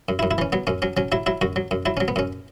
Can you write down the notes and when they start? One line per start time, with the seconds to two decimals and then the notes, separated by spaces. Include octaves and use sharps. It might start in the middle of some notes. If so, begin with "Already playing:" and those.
0.09 F#2
0.19 E4
0.23 F#2
0.31 E4
0.38 E3 C#4
0.52 F#3 B3
0.67 F#2 C#4
0.82 F#3 C#4
0.97 F#3 C#4
1.12 F#3 E4
1.26 F#3 E4
1.41 F#2 F#4
1.56 F#3
1.71 F#2
1.86 F#3 E4
1.97 C#4
2.00 F#3
2.08 B3
2.16 F#2 C#4